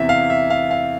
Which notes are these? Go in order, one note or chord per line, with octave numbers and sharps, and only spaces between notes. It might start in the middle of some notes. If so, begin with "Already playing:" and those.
Already playing: E2 C3 E3 E5
F5
E5
F5
F5